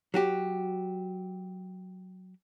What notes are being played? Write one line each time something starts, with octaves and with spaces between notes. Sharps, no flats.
F#3 F#4 G4